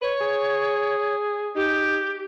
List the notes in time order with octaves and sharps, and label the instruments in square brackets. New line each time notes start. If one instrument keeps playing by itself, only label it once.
[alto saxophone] B4 [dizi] C#5
[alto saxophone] G#4
[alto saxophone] D#4 [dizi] G4